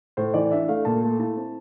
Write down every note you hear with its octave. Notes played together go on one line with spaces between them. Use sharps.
A2 C5
E3 D5
D4 E5
A3 F5
A#2 A5
A3
E4 A5
C4